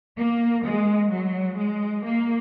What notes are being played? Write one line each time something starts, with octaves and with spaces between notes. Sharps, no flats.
A#3
G#3
F#3
G#3
A#3